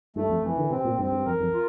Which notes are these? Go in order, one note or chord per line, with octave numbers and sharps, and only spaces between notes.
G2 A3
F2
F2 E3
D3
C3 C4
A#2
G2 C4
G2
F2 A#4
F2
F4